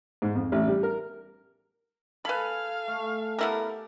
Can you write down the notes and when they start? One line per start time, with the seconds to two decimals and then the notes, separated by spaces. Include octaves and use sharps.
0.22 G#2
0.35 F2
0.52 A1
0.68 G3
0.83 A#4
2.25 A4 B4 F5 G#5 B5
2.88 A3
3.39 B3 E4 G4 A4 A#4